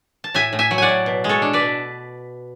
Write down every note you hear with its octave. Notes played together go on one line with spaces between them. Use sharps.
A5
A2 E5 G#5
A2
E5 G#5
F#3
D5 F#5 G#5
A2
B2
G#3
A4 C#5
D4
B4 D5
B2